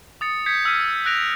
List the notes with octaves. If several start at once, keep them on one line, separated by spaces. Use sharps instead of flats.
D#6 A6 C#7
D#6 G6 G#6 B6 C#7
E6 F6 B6 D#7
E6 F#6 A#6 D7 F7